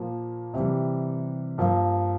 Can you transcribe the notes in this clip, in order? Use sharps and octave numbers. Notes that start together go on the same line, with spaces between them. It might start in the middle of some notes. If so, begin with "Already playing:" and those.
Already playing: A#2 F3 A#3
C3 E3 G3
G2 F3 A#3